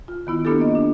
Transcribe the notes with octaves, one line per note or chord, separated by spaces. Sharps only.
F4
D#3 B3 E4
A#3 B3 D4 F4 G4 A4
D#5
D4